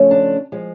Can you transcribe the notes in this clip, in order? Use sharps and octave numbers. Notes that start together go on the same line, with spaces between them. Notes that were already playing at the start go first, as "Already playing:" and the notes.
Already playing: C#3 F3 A3 C#4
D4
F3 G#3